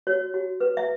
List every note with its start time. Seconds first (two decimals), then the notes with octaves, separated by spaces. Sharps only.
0.07 F#4 C#5
0.34 F#4
0.60 B4
0.77 E5